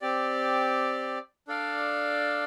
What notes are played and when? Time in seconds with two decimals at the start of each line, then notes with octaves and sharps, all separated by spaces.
0.01 C4 G4 D5
1.48 D4 A4 D5 F5